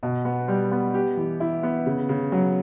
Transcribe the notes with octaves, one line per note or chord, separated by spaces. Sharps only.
B2
B3
G3
B3
G4
E3
E4
B3
C#3
C#3
F#3